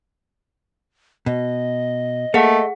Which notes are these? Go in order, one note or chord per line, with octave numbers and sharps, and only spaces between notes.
B2 D#5
A3 A#3 G#4 F#5